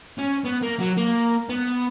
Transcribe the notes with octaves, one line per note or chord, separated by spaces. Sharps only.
C#4
B3
A#3
F#3
A#3
B3